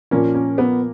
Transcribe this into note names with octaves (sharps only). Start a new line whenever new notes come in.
A#2 F3 A#3 C#4 F4
C#4
B3